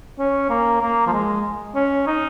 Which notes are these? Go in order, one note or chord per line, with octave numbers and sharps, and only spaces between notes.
C#4
A#3
A#3
F3
G#3
C#4
D#4